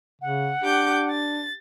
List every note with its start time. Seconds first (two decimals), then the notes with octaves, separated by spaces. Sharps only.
0.22 C#3 F#5
0.61 D4 G4 D6 G6
1.10 A6